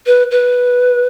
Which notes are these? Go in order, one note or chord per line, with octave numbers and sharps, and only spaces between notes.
B4
B4